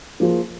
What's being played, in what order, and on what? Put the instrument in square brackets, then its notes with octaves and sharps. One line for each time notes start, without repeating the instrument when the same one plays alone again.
[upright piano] F3 A#3 F4 G#4 C5